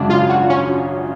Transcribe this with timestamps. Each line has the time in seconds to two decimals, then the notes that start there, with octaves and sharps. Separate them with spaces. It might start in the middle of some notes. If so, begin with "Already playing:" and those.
Already playing: G#1 F#2 C#3 D4
0.10 F4
0.29 F#4
0.50 C#4